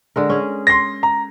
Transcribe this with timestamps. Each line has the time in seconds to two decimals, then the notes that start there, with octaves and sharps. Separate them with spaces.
0.16 D3 G#3 A#4
0.30 C#4 G#4
0.67 C6 A#6
1.03 A#5